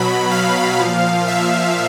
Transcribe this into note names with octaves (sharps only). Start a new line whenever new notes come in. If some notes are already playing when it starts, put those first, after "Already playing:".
Already playing: B2 F#3 B5
F5
A#2 F3
E5